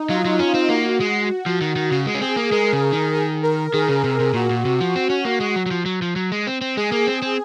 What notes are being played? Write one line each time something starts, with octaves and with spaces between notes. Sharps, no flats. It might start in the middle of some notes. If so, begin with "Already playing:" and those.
Already playing: D#4
F#3 F4
F#3
C#4
C4
A#3 F#4
G#3
F3
D#3
D#3
C#3 F#4
G#3
C#4
C4 G#4
A#3
G#3 A#4
C#3
D#3
G#4
A#4
D#3 G#4
C#3
C3
C3
A#2 F#4
A#2
C3
F3
C4
C#4
A#3
G#3
F#3
F#3
F3
F#3
F3
F#3
G#3
C4
C4
G#3 G#4
A#3
C4
C4